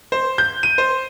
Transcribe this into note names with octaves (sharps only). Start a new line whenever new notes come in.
C5
G6
D#7
C5